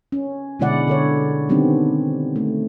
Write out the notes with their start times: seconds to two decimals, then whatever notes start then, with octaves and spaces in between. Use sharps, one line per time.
0.12 C#4
0.60 B2 D3 G#3 E4 D5 F#5
0.88 D3 A4 C#5
1.49 D#3 G3 B3 C4 D4
2.36 A3